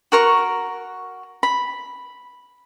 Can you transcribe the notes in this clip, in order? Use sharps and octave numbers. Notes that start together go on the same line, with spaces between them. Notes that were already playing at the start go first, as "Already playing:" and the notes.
F#4 A#4 C#6
B5